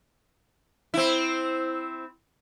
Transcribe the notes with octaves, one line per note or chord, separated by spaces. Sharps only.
C4 E4